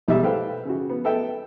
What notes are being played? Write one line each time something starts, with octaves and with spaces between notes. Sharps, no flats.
B1 G3 G#3 D#5 E5
A4 B4 C5 F5 G5
C#3 F#4
B3
B3 A4 E5 G5